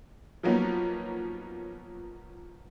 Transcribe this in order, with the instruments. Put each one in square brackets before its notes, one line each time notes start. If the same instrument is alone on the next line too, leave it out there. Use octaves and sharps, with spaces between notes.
[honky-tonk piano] F3 F#3 A#3 B3 C#4 D#4